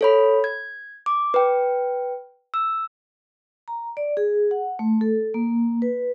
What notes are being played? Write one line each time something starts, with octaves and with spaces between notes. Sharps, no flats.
A4 C#5 B5
G#6
D6
B4 G5
E6
A#5
D5
G#4
F#5
A3
A4
A#3
B4